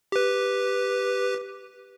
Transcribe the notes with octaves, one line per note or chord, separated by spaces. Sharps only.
G4 B4